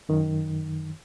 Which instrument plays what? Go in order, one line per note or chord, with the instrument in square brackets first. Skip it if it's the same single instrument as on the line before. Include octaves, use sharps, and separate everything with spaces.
[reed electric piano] F#2 D#3